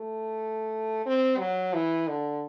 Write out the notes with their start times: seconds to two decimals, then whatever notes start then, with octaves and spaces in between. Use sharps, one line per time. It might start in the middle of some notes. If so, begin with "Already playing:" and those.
Already playing: A3
1.06 C4
1.39 F#3
1.74 E3
2.08 D3